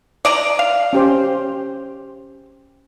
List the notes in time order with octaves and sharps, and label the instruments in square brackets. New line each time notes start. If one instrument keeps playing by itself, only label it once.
[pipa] D5 D#5 A#5
F5
[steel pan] C#4 G4 C5